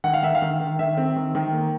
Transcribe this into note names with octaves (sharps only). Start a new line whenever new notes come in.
D#3 F#5
F5
D#3 E5
F5
D#3
D#3
D#3 E5
C4
D#3
D#3
A#3